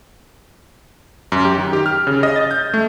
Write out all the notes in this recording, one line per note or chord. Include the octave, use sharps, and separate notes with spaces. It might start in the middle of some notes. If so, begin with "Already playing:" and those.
F#2
G4
D#3
G4
F6
C#3
D#5
A6
G6
A3